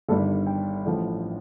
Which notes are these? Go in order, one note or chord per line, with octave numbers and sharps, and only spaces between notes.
G1 G2 D#3 G3 A4
G5
A1 A2 F3